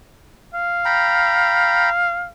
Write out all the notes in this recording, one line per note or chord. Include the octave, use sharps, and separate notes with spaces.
F5
G5 A#5 B5